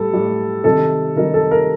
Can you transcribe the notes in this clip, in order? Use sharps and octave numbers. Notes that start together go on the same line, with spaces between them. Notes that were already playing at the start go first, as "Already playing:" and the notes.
Already playing: A2 G3 A4
A2 G3
C3 D#3 G3 A4
C3 D#3 G3 A#4
A4
A#4